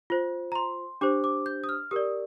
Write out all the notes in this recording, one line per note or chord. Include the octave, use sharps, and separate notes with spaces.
F4 C5
A#5
C6
D4 G4 C5 D6
D6
G6
D#6
F6
G4 A#4 D5 D#6